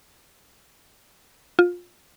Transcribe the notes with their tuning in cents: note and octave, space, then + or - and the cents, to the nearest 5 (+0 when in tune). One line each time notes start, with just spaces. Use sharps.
F4 +20